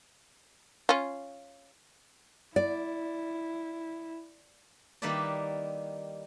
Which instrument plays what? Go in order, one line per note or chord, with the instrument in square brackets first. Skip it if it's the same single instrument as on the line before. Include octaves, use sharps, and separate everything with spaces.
[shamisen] C#4 F4
[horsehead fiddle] E4 [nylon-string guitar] D5
[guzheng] D#3 G3 A#3 E4 B4 D5